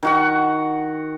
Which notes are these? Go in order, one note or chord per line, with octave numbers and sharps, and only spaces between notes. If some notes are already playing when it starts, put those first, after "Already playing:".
D#3 F#4 F#5